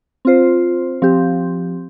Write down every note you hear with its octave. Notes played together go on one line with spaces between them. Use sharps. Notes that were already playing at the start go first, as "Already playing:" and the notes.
C4 F4 C5
F3 C4 G4